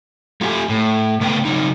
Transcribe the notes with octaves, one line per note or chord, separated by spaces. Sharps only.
A3 F4 G4 F#5 G#5
A2
C#3 A3 B3 B4 C#5 G5
C#3 F#3 D#4